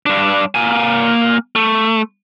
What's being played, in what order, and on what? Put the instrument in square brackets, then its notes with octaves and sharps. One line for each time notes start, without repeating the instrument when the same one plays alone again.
[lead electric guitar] G2 D4
A#3 G#5
A3